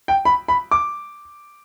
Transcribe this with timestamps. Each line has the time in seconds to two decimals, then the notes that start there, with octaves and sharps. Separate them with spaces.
0.08 G5
0.25 B5
0.48 B5
0.71 D6